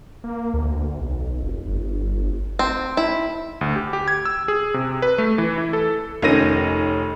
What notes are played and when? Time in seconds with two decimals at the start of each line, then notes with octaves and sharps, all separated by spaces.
0.24 A#3
0.54 D2
1.00 B1
1.42 F1
1.67 G1
2.59 C4
2.97 E4
3.61 D2
3.76 G4
3.93 G4
4.08 G#6
4.25 E6
4.48 G#4
4.74 C3
5.02 B4
5.18 A3
5.38 E3
5.58 E4
5.73 A4
6.22 F1 D#3 C#4 A#6 D#7